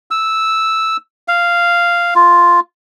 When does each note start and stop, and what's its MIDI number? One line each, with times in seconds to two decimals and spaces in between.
0.11 0.97 88
1.28 2.14 77
2.15 2.60 65